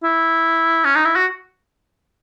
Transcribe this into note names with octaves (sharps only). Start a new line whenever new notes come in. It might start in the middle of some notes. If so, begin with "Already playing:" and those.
E4
C#4
D#4
E4
F#4